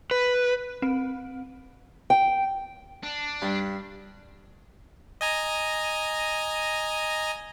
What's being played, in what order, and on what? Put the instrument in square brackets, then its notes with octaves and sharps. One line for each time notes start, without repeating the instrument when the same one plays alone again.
[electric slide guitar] B4
[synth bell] C4
[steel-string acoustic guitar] G5
[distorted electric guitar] D4
[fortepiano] G2
[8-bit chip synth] D#5 G#5 A#5